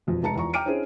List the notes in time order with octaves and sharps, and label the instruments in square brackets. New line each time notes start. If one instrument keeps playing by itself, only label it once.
[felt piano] E1 F2
F1 G#3 A5 A#5 C#7
E2 F3 A#5 C#6
G5 A#5 D6 F6 D7 D#7
C#4 D4 E4 G#4 C5